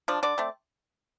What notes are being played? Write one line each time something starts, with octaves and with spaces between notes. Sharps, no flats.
F3 D4
D3 D5
A3 C4